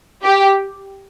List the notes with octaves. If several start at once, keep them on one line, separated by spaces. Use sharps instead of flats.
G4